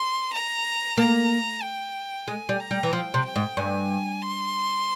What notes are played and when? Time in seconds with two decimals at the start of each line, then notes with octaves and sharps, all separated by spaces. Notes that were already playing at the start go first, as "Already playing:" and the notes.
Already playing: C6
0.33 A#5
0.97 A#3 A#5
1.62 G5
2.27 G#3 G#5
2.49 G3
2.60 A#5
2.71 G3
2.83 E3
2.92 F3 G5
3.14 C3
3.25 G5
3.36 G#2
3.57 G2 G#5
4.22 C6